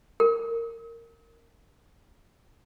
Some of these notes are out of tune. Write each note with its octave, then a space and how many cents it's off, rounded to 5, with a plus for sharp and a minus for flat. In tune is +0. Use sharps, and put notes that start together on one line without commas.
A#4 -15